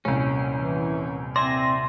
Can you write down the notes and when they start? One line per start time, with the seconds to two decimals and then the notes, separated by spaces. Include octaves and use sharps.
0.05 D#1 C2 C#4
0.55 E3
1.36 C4 D5 E5 G#5 C6 A#6